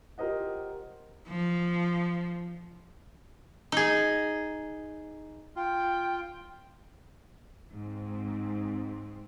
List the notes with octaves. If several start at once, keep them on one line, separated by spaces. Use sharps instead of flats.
F4 G4 A#4 C5 D#5 F#5
F3
D#4 G#4
F4 G5
G#2 C4